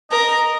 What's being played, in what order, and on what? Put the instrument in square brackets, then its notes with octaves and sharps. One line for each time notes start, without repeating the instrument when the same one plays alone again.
[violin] A#4 [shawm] D#5